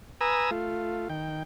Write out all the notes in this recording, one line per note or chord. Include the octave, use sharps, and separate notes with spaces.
B4 G#5 A#5 D#6 E6
A3 F4
D#3 G5